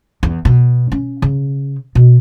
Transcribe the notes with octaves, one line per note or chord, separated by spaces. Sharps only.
E2
B2
C#4
C#3
B2